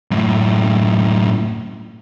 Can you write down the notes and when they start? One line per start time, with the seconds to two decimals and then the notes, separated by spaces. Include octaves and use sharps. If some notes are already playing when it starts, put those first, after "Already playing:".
0.11 F#2 A2